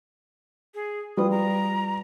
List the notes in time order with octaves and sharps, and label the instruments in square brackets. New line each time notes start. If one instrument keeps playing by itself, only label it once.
[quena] G#4
[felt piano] G3 F4 B4 [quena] D#6
[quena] A#5